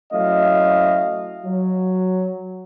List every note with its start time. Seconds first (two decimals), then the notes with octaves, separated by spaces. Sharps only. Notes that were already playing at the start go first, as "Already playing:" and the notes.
0.12 F#3 A3 C#4 E4 D#5 F5
1.45 F#3